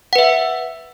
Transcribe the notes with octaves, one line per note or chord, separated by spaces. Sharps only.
B4 E5 F#5